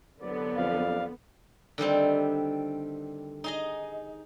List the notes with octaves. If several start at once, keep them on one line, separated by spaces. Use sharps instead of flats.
C2 D3 F#3 B3 D5
F2 F5
D3 D#3 G3 C4
D#4 G#4 D#5